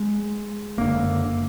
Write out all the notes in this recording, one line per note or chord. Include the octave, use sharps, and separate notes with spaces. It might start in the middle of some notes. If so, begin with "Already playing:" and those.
Already playing: G#3
F#1 F#2 D3 A#3